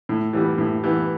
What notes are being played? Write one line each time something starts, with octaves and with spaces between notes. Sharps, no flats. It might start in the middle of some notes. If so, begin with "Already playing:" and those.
A2
E3 G3 B3
A2
E3 G3 B3